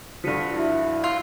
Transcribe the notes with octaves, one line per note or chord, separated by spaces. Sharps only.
G2 D3 F3 B6 C#7 D#7
E4 F#4 E5
F4 E6